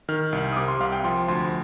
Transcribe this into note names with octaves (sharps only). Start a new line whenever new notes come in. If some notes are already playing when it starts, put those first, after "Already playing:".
D#3 F6
C2
D#6
C3 D6
C6
C2 F5
G5
F3 C6
D2 C6